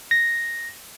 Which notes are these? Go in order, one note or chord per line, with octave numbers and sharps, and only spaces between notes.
A#6